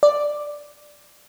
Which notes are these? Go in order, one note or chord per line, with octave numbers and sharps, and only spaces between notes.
D5